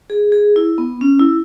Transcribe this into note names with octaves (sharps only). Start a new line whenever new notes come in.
G#4
G#4
E4
B3
C#4
E4